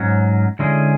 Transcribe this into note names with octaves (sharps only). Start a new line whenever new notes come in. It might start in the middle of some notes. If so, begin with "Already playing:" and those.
Already playing: G#2 F#3 C#4
D3 G#3 C#4 E4 G#4